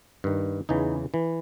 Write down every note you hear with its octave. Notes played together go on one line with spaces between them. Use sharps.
G2 D#3
E2 C#3 E3 D#4
E3